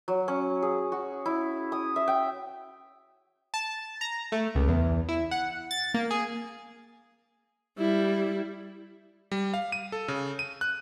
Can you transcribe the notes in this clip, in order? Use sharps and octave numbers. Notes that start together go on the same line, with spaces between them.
F#3
C#4
G#4
F#4
E4
D#6
E5
G5
A5
A#5
A3
C#2
E2
E4
F#5
A6
A#3
G#4
G3 E4
G3
F5
D#7
A4
C#3
D#7
F#6